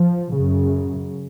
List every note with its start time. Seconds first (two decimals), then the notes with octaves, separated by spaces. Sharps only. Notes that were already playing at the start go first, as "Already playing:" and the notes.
Already playing: F3
0.33 F#2 C#3